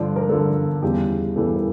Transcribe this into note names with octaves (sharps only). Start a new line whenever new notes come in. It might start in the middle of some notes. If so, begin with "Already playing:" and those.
Already playing: G2 D3 F3 D5
A#4
G2 D3 F3 A4
E2 C#3 E3 G3 G4
E2 C#3 E3 G3 A4
A#4